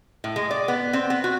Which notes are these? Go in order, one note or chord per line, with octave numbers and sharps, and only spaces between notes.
A2
G#3
D5
B3
C4
B3
F#4